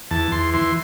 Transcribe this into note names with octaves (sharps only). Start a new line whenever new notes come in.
E2 A5
E2 C6
E3 C6